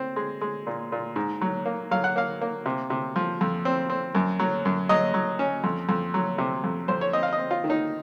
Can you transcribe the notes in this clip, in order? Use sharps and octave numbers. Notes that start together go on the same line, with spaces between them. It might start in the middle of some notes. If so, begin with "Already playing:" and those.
Already playing: C4
G#3
G#3
A#2
A#2
G#2
F#3
A#3
F#3 F5
F#5
A#3 F5
A#3
C3
C3
F3
F2
C4
C4
F#2
F#3
F#2
F#3 D#5
F#3
C#4
F2
F2
F#3
C3
F2
F2 C5
C#5
C4 D#5
F5
D#5
C4
F4
D#3
D#4